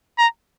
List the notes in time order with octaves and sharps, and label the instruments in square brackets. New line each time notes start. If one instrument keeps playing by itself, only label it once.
[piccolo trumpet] A#5